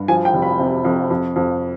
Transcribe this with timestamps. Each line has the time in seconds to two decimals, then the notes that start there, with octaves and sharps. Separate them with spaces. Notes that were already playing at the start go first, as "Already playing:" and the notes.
Already playing: G2
0.08 F3 G#5
0.25 G5
0.34 F1
0.42 B5
0.59 C3
0.85 F2
1.10 F2
1.36 F2